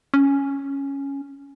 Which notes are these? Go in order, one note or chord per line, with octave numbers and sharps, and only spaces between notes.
C#4